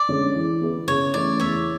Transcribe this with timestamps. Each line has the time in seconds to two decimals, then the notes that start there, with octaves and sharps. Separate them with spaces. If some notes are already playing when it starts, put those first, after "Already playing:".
Already playing: D5
0.09 D3 G#3 C#4
0.35 E3
0.61 B3 E4 G#4 B4
0.88 C#3 C#5
1.14 E3 A3 C#4 E4 D5
1.39 E2 C#5 E5